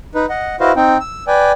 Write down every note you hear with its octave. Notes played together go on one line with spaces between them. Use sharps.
D#4 B4
D#5 F#5
E4 F#4 B4 C5 D#5 F5
C4 D#4 G5
E6
B4 D5 G5 G#5